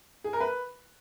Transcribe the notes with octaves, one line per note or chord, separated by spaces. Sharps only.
G#4
A#4
B4